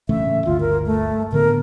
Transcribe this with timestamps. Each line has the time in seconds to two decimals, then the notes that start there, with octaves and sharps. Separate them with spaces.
0.09 A1 C#3 A3 E5
0.46 G1 D2 F4
0.60 A#4
0.86 A3
1.32 A2 D3 B3 A#4